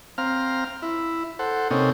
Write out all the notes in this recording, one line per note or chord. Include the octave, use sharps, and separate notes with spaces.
C4 F5 A#5 F6
E4
A4 C5 F#5
C3 A#3 C4 C#4 D#4 A4